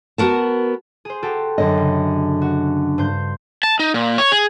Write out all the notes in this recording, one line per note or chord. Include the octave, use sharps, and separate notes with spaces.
B3 F#4 A#4 A5
G#4 C5
F#4 G4 A4
F#2 D3 D#5
C#3
F#4
G2 C5 G6
A5
D#4
A#2
C#5
G#4